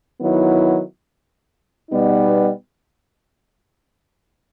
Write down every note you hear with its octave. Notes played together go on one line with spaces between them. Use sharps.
D#3 F#3 B3 E4
B2 G3 B3 D#4